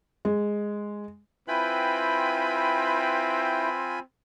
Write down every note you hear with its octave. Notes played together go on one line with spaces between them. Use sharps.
G#3
C4 E4 F4 B4 G5 G#5 B5